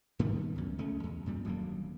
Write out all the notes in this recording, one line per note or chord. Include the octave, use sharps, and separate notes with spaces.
G#2 D#3 G3 B3
C#2 F#2
C#2 A3 C#4
E2
G2 A#2 G3
D#1 D2 F#3 A#3